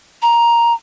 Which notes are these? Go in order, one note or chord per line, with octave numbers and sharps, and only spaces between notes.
A#5